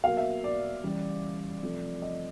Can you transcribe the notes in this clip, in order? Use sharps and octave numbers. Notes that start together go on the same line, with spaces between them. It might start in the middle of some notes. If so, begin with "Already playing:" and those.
B2 F#3 A#3 F5
E5
D5
C#3 E3 G3
C3 F3 A3
D#5